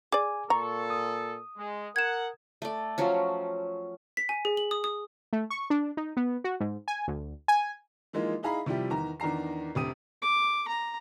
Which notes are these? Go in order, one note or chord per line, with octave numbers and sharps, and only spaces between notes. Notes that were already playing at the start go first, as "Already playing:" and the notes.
G#4 D5 G#5 D6
A#2 A4 A#5 C#6
D#6
G#3
A#4 F#5 G#6 E7
A3 D5
F3 F#3 C#4
B6
G#5
G#4
F#7
D#6
D#6
A3
C#6
D4
D#4
B3
F#4
G#2
G#5
D2
G#5
E3 F3 G#3 A#3 D#4 F4
D#4 E4 G#4 F5 A#5 B5
C3 F3 G3 E4 G4
E2 D#3 A#5
E2 D#3 D4 A#5 C7
F1 G2 C3 G4 D#6 D#7
D6
A#5